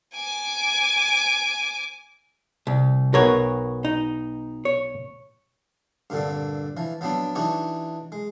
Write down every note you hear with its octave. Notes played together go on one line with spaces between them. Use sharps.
G#5 D6
C2
B1 B3 F#4 A#4 C#5
D#4
C#5
G2 A#2 D3 C4
E3 F3
F3 F#3 B3 C4 D4
E3 D4 D#4 F#4 G4 C#5
G#3